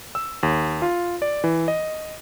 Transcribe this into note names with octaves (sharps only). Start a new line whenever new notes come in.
E6
D#2
F4
D5
E3
D#5